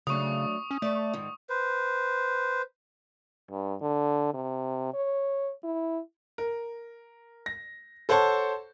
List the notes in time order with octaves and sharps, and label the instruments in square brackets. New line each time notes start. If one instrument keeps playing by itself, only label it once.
[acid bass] C#3 [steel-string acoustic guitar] F#3 A3 D4 [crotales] C#6 D#6
[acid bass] C#4
[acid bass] A3 [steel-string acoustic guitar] A4 D5
[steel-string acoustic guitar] G#2 D#3
[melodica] B4 C5
[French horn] G2
D3
C3
C#5
E4
[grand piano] A#4
A#6
A4 C5 C#5 F#5 A5 C#6